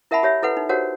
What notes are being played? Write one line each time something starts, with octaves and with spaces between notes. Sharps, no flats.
E4 A#4 E5 F#5 A5 B5
G4 C#5 E5
E4 A4 B4 F#5
D#4
F#4 G4 A#4 C5 C#5 F#5